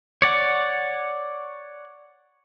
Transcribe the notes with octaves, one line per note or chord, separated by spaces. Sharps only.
C#5 D5 F#5